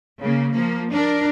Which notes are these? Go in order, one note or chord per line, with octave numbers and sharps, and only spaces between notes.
C#3 A#3
F3 A#3
D4 A#4